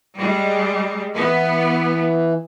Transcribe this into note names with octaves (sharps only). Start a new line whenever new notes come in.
G3 G#3
E3 B3